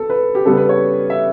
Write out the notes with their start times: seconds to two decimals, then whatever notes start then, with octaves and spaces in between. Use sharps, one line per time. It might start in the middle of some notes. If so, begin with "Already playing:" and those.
Already playing: B3 A4
0.10 B4
0.35 G4
0.45 C#3 G3 B3 A4
0.57 B4
0.69 C#5
1.10 E5